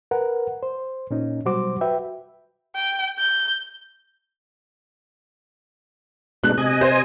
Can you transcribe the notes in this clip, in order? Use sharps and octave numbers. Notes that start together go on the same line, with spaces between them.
A#4 B4 F#5
C5
A#2 C#4 D#4
B2 F#3 G3 F#4 C5 D6
F#4 B4 E5 G5
G5
G6
B2 G#3 D4 F#6
C3 D#5 G#5
C5